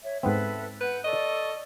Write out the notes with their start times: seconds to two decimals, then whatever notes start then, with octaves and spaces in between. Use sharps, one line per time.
0.04 C#5 E5
0.23 G#2 B3 C4 A4 B4 E5
0.81 B4 F#5 G6
1.04 A4 D5 D#5 C#6